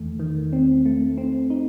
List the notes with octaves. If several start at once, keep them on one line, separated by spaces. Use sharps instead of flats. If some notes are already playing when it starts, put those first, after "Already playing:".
Already playing: E2 D#3 A3
D#3
C4
A3
C4
D#4